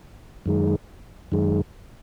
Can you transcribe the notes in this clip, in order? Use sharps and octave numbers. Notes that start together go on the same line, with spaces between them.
F#2 D#3 G#3
F#2 D#3 G#3